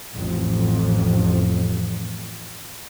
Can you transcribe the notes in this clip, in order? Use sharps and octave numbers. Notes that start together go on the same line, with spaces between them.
A1 F2